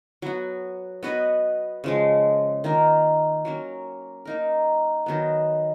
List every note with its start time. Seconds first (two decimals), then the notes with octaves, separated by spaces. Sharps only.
0.22 F#3 B3 F#4
1.03 B3 F#4 B4 D#5
1.84 C#3 F3 G#3
2.64 D#3 A#3 F4 A#4
3.45 F#3 A#3 C#4
4.25 A#3 D#4 A#4
5.06 D#3 F#3 B3